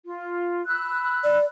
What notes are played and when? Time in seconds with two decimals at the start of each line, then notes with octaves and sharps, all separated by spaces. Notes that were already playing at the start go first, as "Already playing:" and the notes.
0.04 F4
0.67 B5 E6 F#6
1.24 D5